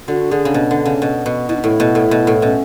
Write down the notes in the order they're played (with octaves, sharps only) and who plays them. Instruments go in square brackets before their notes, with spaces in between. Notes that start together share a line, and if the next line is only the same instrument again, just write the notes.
[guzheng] D3 [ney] F#4
[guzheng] D3 [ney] G#4
[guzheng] C#3
B2
D3
C#3
B2
B2
[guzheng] B2 [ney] E4
[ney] D4
[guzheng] A2 [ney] E4
[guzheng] B2
A2
B2
A2
[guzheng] B2 [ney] C#4